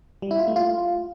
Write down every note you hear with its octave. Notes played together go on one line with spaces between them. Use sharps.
G3
E4
F4
A3
F4